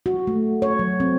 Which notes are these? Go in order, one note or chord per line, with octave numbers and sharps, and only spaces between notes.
F#4
A3
C#5
F#3
C4